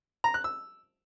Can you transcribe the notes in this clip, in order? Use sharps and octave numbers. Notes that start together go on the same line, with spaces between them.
A#5
F#6
E6